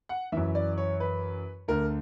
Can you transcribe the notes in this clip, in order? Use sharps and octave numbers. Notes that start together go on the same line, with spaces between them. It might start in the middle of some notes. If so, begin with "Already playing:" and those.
F#5
F#2 E3 E5
D5
C#5
B4
D2 D3 A#4